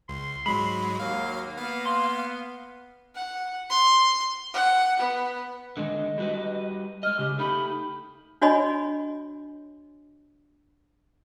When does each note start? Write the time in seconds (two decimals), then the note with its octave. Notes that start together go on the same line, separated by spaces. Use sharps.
0.09 C#2 C6
0.46 G#2 F#3 G#3 B5
1.00 D#2 F#3 A#3 F5
1.57 B3 F5
1.86 C6
3.15 F#5
3.70 C6
4.53 F#5
4.99 B3
5.77 D3 D#3 G#3 D#5
6.18 G3 F#4 B4
7.03 G#3 D#5 F6
7.19 C#3 G4
7.39 A3 D#4 G4 B5
8.42 D4 F#4 C#5 D#5 G#5 B5